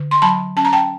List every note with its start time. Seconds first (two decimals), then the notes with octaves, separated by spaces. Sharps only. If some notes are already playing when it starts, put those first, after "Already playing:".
Already playing: D3
0.11 C6
0.22 F#3 A5 B5
0.57 C#4 A5
0.65 A#5
0.73 G5 A5